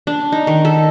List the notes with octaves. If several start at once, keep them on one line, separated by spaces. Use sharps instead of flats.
D4
D#4
D#3
A4